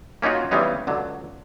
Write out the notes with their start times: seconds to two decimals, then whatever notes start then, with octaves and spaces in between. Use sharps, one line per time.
0.22 A#3 C#4 D#4 F4 F#4
0.51 C#3 E3 G3 G#3 B3 D#4
0.87 C#2 D3 F#3